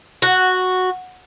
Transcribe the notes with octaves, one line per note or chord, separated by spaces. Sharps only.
F#4